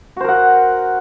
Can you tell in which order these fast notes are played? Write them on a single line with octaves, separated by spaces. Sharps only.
F#4 C5 A#4 F#5